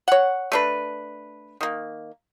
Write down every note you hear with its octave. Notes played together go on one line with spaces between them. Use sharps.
C#5 F#5
A3 D4 B4
D#3 A#3